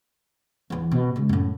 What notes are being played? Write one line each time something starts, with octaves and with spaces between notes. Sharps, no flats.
E2 E3
B2
C#3 G#3
F#2 A2